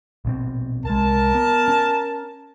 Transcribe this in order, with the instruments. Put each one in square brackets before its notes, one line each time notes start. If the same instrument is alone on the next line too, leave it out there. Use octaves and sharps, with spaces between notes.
[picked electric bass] A#1 B2 C4
[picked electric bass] C2 G#3 [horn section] A#4 A5
[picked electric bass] B3
C#4